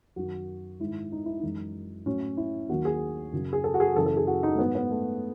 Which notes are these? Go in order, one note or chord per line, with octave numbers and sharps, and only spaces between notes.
F#2 D#3 F#3 F#4
G#2 D#3 G#3 E4
D#4
E4
F#2 E3 G#3 D#4
A2 F#3 C#4
E4
D#2 D#3 F#3 F#4
G#4
F#2 C#3 F#3
G#4
A4
F#4
G#4
F#2 C#3 E3 A4
A4
G#4
F#4
D#4
A3
G#2 F#3 B3
B3
A3